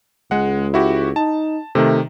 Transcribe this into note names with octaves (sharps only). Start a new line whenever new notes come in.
C#2 G#3 F#5
E4 F#4 G4
D#4 A5
C3 D#3 A3